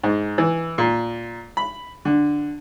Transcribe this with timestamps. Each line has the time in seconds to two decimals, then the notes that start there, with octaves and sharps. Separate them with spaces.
0.04 G#2
0.38 E3
0.78 A#2
1.57 B5
2.05 D3